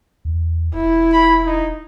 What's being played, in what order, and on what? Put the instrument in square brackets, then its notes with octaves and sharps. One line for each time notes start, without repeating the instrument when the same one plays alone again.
[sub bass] E2
[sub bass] E1 [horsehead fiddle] E4
[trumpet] B5
D#4